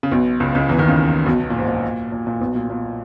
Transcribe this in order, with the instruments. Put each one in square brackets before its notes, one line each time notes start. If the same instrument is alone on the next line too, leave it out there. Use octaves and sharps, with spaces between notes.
[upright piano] C#3
B1 B2
C#2 C#3
C#2 C#3
E2 E3
D#2 D#3
C#2 C#3
B1 B2
B2
A#2
G#2
A#2
A#2
A#2
B1 B2
A#2
A#2